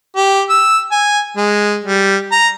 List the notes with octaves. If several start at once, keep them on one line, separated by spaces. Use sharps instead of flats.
G4
E6
G#5
G#3
G3
A#5